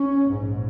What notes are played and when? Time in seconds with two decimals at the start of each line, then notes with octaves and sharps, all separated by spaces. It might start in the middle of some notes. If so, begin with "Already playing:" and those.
Already playing: C#4
0.24 A#1 G#2